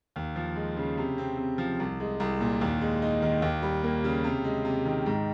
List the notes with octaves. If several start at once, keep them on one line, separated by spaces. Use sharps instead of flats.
D#2
F3
G#3
C#3
C3
C4
C3
F3
C2
G#3
C2
A#2
D#2
G#3
D#4
D#3
D#2
G3
A#3
C#3
C3
G#3
C3
D#3
G#2